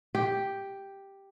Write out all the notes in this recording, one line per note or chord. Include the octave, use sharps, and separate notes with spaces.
G4